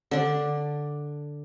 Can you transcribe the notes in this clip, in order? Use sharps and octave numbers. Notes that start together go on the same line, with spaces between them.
D3 D4